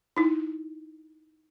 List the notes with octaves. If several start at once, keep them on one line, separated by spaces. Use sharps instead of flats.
D#4 E4